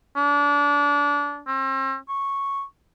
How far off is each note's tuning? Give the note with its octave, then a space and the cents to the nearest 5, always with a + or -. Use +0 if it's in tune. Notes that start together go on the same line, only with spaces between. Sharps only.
D4 -25
C4 +40
C#6 -5